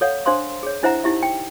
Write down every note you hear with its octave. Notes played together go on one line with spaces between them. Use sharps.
A4 C#5 F5 F#5
D4 C5 F5 C6 D#6
G#4 C#5
D4 E4 C5 E5 F#5 A#5
D#4 E4 G4 E5
G5